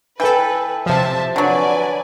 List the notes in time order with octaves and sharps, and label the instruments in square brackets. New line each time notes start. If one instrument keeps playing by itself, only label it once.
[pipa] E3 [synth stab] A4 G5 [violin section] B4
[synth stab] C3 F3 [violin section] C5 E5 A5
[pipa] D3 F#3 [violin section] B4 D5 G#5